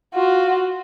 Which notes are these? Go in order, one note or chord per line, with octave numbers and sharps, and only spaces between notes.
F4 F#4